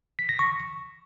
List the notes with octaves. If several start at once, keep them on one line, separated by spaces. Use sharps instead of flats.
B6
A#6
C#6